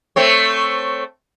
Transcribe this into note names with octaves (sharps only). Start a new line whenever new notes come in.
A3 C4 C#5